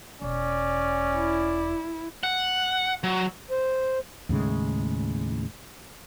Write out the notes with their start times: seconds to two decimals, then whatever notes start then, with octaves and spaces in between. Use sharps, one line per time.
0.22 E1 C#4 D5
1.16 E4
2.23 F#5
3.04 F#3
3.50 C5
4.29 D#2 A2 C#3 G#3